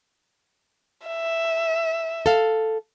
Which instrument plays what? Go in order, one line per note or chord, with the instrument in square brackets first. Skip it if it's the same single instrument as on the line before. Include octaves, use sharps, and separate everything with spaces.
[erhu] E5
[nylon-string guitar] A4 F5